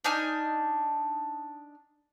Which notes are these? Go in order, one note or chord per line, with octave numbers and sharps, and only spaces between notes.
D4 D#4 G#5 F6